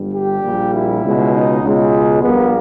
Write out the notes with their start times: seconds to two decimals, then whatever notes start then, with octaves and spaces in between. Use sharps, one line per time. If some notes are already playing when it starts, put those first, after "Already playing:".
Already playing: G1 G2 G3
0.12 G4
0.42 A#1 A#2 G3
0.73 E4
1.03 C#2 B2 G#3
1.33 D#4
1.63 C#2 B2 G#3
2.23 A#1 A#2 G3 A#3 B3